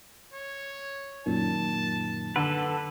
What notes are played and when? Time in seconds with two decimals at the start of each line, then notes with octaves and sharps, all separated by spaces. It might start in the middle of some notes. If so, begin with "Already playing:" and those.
0.33 C#5
1.26 F#2 A#2 D#3 A5
2.36 D3 A4 B4